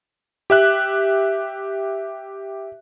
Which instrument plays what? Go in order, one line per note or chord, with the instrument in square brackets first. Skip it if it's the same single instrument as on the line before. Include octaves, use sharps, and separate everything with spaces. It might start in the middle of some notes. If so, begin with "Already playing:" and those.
[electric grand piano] G4 E5 F#6